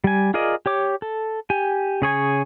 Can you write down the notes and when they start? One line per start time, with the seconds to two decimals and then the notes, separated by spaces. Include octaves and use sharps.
0.04 G3 G#5
0.34 F4 G#4 A#4 D5 D#5
0.66 G4 C#5 D6
1.02 A4
1.50 G4 G#5
2.02 C#3 G#4 C#5 G#5